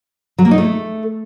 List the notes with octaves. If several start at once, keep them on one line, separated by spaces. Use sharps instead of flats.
F#3
A#3
D#4
A3